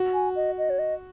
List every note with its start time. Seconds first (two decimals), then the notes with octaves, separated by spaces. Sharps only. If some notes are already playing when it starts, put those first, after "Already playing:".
Already playing: F#4
0.14 G#5
0.36 D#5
0.58 D#5
0.70 C#5
0.79 D#5